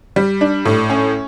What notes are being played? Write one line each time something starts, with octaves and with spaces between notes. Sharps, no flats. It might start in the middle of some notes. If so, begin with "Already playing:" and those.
G3
D4
A2
C#4